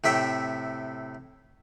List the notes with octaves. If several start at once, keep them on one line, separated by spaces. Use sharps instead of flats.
A2 C3 E5 G5